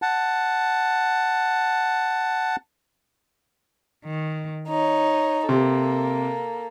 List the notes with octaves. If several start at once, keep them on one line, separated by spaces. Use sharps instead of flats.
F#5 A5
D#3
D#4 C#5
C3 A#3 A4